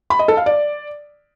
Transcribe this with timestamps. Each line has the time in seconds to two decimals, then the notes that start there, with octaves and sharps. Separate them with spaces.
0.10 B5
0.19 D#5
0.28 A4
0.37 F5
0.46 D5